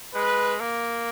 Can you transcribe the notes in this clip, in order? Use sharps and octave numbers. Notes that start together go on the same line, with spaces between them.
G#3 B4
A#3